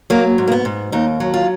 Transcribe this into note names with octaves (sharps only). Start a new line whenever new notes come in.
F#3 A#3
G#2
A#3
B3
G#2
D#2 D#4
F#3
F4